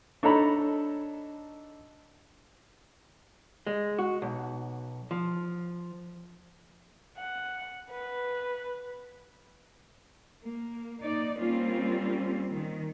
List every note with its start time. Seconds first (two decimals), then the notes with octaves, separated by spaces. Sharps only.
0.23 D4 D#4 A4 C#5 A#5 B5
3.67 G#3
3.99 F#4
4.22 B1
5.11 F3
7.18 F#5
7.91 B4
10.44 A#3
11.02 A#3 D#4 D5
11.39 G3 A#3 C4 C#4 F4
12.54 D#3